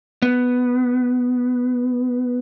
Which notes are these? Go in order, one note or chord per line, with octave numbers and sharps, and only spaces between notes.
B3